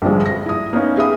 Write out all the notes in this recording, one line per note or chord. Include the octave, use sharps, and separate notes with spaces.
A#1 G2 D3 F3 G3 G#3
A#6
E4 D#6
A#3 B3 C#4 D#4
G4 G#4 E5 F5 B5 D#6